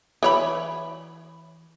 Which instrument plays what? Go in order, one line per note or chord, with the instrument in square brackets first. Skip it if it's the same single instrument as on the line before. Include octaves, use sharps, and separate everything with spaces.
[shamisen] E3 C#5 B5